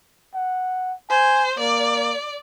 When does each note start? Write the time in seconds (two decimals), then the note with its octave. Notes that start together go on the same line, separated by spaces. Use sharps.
0.35 F#5
1.10 C5 G#5
1.59 A#3 D5